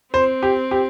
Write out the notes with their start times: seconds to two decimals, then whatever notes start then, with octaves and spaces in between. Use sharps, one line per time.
0.14 C4 C5
0.43 G4
0.71 G4